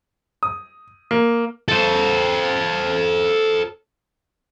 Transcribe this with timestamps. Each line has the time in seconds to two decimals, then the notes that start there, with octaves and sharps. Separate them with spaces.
0.43 D#6
1.11 A#3
1.68 A4 C5